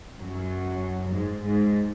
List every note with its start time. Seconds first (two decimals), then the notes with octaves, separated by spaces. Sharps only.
0.17 F#2 F#3
1.12 G#2 G#3
1.44 G#2 G#3